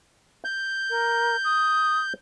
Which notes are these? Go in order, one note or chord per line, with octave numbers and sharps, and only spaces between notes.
G6
A#4
D#6